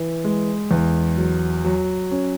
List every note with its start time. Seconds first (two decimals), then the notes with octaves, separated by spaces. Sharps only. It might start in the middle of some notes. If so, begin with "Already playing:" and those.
Already playing: E3
0.24 G#3
0.71 E2
1.17 F#3
1.64 F#3
2.11 C#4